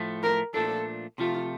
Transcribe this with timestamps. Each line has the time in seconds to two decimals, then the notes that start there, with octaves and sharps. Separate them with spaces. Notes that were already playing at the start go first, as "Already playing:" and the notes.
Already playing: A2 F3 A3
0.23 A#4
0.54 A#2 F3 A3 D4 A4
1.18 C3 F3 A3 F4